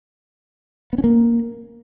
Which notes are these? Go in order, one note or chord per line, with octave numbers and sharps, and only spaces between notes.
B3
C#4
A#3